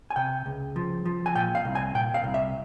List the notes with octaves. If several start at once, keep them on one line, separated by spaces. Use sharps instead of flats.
G#5
C3 G5
C#2
F3
F3
G#5
A#2 G5
F5
C2
G#5
A#2 G5
F5
C2
E5